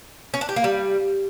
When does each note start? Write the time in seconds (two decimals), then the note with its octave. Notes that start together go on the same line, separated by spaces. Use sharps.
0.34 C#4
0.41 D4
0.49 G4
0.56 A#3
0.64 G3